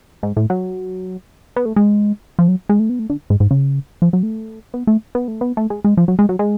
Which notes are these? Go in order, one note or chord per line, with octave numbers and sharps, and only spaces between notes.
G#2
A2
F#3
B3
A3
G#3
F3
F#3
G#3
A3
B3
A3
D3
G#2
G#2
C#3
F3
F#3
A3
B3
A3
B3
A3
B3
A3
G#3
G#3
F3
F#3
G#3
F#3
G#3